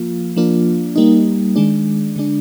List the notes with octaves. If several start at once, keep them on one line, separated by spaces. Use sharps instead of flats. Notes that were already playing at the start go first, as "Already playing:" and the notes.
Already playing: F3 A#3 F4
F3 A#3 D4 F4
G3 A#3 D#4
D#3 G#3 D4
D3 G#3 D4